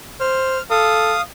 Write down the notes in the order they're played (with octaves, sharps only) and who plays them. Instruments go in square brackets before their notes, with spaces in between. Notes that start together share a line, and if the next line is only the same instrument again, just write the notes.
[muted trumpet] C5 [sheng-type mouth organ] F6
[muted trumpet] A4 [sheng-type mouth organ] F5 D#6